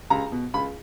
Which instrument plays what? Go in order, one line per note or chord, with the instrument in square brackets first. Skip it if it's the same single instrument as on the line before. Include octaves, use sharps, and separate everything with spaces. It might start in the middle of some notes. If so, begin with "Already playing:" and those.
[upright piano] C#2 A#5
B2
C#2 B5